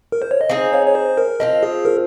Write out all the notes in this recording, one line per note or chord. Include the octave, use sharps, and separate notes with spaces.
A#4
C5
C#5
D#5
C4 D#4 G#4 F5
C#5
C#5
C5
A#4
F3 C4 F4 D#5
G#4
A#4